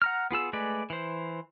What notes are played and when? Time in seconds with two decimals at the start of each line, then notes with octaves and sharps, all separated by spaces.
0.02 F#5 A#5 F6
0.31 B3 F4 G#4 E6
0.53 G#3 A3 G#4 B4 D5
0.90 E3 C5